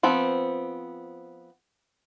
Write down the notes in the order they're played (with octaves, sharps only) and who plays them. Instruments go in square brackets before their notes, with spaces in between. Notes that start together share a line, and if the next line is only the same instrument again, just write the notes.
[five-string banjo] F3 B3 C4